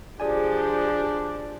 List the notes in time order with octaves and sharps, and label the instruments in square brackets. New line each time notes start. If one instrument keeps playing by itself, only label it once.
[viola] F3 G4 [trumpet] D4 [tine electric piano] G#4 D5 G#5